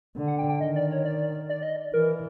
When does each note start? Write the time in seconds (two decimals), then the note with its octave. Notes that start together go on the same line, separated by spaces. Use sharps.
0.16 D3
0.27 F#5
0.38 G5
0.49 G5
0.60 D#3 D#5
0.76 D5
0.91 C#5
1.05 D5
1.49 D5
1.63 D#5
1.76 D5
1.93 E3 A#4